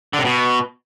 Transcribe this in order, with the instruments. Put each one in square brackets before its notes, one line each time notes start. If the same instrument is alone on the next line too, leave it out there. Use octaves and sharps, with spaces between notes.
[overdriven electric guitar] D3
C3
B2